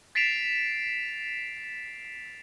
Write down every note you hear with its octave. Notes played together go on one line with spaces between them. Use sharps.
A6 B6 C7 D7 E7 F7